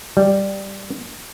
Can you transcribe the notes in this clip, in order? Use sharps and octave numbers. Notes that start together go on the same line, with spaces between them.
G3